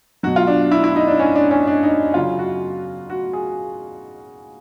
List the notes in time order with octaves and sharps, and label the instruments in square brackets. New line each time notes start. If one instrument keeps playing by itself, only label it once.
[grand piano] B2 F#3 F#4
F4
D4
E4
E4
D#4
D4
C#4
D4
C#4
D4
D#4
C#3 F#3 F4
F#4
F#4
G#4